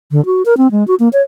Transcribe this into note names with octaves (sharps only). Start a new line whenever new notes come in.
D3
F#4
A#4
C4
G#3
F#4
A#3
C#5